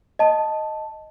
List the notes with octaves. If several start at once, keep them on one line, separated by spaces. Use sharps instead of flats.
D#5 A5